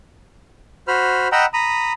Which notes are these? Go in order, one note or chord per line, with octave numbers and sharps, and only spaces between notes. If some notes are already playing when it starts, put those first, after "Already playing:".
F#4 C5 B5 F6
D#5 F#5 G5 A#5 B5 E6
A#5 B5 D#6